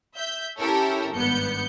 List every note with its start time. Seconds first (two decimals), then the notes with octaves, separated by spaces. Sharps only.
0.17 E5 G6
0.58 C#4 E4 G4 A4 A#4 C#5
1.13 G#1 G2 B3 G6 C#7